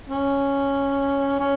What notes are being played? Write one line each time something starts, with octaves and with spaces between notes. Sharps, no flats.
C#4
C#4